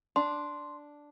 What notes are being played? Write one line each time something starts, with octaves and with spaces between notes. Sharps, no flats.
D4 C6